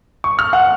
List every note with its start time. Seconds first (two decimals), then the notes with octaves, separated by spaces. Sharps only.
0.24 C#6
0.39 F6
0.53 F#5